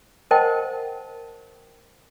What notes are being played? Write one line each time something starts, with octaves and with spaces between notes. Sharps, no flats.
A#4 C5 D#5 F#5 G5 A5